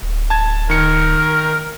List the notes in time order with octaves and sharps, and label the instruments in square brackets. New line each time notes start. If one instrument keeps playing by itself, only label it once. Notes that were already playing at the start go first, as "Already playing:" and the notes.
[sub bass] D1
[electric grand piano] A5 G#6
[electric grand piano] D#3 C#7 [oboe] A#4